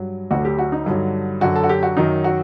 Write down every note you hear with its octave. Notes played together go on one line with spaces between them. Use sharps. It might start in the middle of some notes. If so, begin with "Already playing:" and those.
Already playing: G2 F#3
D2 D3 F#3 F#4
G4
F#4
D#4
G2 D3 F#3
F#2 D3 F#3 F#4
A4
F#4
G4
F#4
F#2 D#3 F#3 D#4
F#4